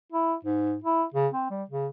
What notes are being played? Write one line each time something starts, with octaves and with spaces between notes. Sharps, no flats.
E4
G#2
E4
C#3
C4
G3
C#3